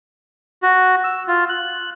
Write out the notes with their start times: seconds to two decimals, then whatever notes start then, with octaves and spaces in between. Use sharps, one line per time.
0.63 F#4
1.04 E6
1.28 F4
1.49 F#6